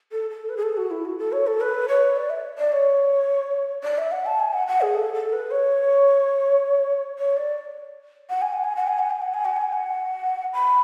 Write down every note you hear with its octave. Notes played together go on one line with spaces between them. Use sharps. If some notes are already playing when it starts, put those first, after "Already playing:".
A4
A4
B4
G#4
A4
F#4
E4
F#4
A4
C#5
A4
B4
C#5
D5
E5
D5
C#5
D5
E5
F#5
A5
G#5
F#5
F#5
G#4
A4
A4
B4
C#5
C#5
D5
F#5
G#5
F#5
G#5
F#5
G#5
F#5
G#5
F#5
G#5
F#5
G#5
G#5
F#5
B5